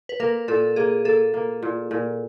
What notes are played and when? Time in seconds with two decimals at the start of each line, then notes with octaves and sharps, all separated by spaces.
0.09 B4
0.20 A#3 A#4
0.48 A#2 A4
0.76 A#3 G#4
1.05 A#3 A4
1.34 A#3
1.63 A#2
1.91 A#2